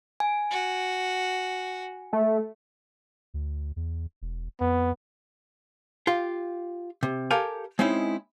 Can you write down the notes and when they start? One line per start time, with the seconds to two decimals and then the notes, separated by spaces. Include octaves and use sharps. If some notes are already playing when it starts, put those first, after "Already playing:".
0.20 G#5
0.51 F#4
2.13 A3
3.34 D2
3.76 E2
4.22 E1
4.60 F2 B3
6.07 F4 G4
7.03 C3
7.31 G4 A4 A#4 F5 G#5
7.79 G#3 C4 C#4 D#4 E4